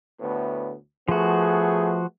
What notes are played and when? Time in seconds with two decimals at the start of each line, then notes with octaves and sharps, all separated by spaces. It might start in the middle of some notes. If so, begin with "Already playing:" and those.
0.20 D2 A2 B3
1.08 F3 A3 B3 F#4 G#4